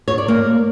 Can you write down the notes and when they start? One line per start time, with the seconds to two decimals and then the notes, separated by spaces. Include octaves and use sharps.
0.08 C#5
0.18 D5
0.28 A#3